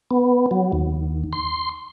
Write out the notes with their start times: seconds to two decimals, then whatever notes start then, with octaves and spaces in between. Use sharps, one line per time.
0.11 B3
0.51 F#3
0.72 D#2
1.33 C6